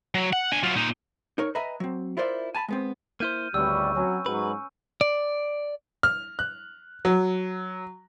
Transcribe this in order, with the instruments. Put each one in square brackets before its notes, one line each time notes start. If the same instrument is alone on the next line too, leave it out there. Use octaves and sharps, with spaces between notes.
[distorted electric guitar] F#3
F#5
D4 G#5
F#3 F4
A#2 D#4
[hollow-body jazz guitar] D#4 A#4 C#5
B4 D#5 E5 G#5 A#5 B5
F#3 C4
E4 F4 A#4 C5 D5 E5
G#5 A5 B5
G#3 B3 C4
[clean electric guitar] A#3 E4 C5 [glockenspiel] F6 G6 D#7
[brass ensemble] G#1 G3 [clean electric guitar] D2 [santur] B4 C#5 G5 [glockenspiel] E6
[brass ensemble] F#3 [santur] C4 C#4 G#5
[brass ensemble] G#2 F#3 [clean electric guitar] B4 [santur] C#6
[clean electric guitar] D5
[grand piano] F6
F#6
F#3